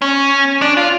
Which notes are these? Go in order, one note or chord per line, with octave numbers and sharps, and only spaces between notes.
C#4
D4
F4